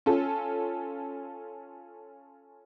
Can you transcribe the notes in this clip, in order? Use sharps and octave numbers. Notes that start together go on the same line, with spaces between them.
C#4 F4 A4